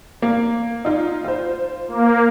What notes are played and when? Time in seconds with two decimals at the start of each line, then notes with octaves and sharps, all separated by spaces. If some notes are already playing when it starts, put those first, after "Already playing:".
0.22 A#3
0.85 D#4 F4
1.24 F4 C5
1.88 A#3